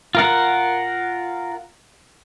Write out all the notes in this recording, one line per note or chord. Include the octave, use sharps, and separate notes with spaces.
F4 A#4 F#5